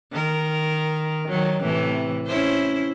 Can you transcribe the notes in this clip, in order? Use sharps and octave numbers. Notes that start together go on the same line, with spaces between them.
D#3 A#4
D#3 F#3
A2 C3 E3
C#4 E4 C5